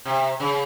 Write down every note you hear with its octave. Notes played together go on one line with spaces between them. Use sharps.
C3
C#3